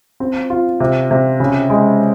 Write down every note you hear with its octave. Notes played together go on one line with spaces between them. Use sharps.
C4
F4
C3
C3
C#3
G#3